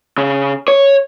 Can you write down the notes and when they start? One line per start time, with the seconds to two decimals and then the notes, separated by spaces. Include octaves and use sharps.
0.18 C#3
0.68 C#5